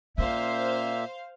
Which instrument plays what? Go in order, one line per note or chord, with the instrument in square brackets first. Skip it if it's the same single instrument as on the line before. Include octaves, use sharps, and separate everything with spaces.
[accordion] A#2 A#3 E5 [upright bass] C#4 [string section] C5 F5